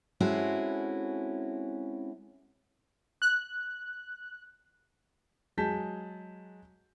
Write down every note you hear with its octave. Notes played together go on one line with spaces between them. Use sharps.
G#3 C4 C#4 E4 F#4 A4
F#6
F#3 G#3 G#4 A5 G6 B6